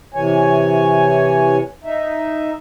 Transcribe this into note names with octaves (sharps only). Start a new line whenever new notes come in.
C3 E3 C#5 G#5
D#4 E5